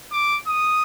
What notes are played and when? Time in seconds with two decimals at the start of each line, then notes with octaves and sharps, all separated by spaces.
0.12 D6
0.47 D#6